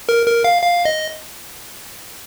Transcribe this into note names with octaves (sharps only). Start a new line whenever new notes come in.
A#4
A#4
F5
F5
D#5